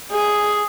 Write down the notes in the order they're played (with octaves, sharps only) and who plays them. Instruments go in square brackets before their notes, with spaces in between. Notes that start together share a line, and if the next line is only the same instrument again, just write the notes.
[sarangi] G#4